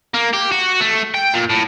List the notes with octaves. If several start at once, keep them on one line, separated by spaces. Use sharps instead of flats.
A#3
G4
F#4
A3
G5
A#2
A2